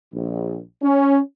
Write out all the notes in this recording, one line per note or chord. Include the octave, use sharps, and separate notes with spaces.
A#1
C#4